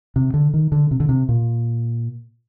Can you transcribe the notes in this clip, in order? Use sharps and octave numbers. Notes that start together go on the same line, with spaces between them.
C3
D3
D#3
D3
C3
D3
C3
A#2